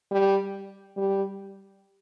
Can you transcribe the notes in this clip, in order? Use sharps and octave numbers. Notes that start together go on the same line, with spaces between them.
G3
G3